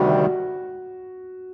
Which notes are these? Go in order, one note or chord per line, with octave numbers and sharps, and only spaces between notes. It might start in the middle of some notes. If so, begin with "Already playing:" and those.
Already playing: D2 C3 D#3 G3 F#4